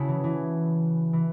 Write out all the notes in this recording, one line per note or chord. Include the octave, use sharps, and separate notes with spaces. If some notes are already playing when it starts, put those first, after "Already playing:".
Already playing: C#3 E4 F#4 A4
E3
E3
E3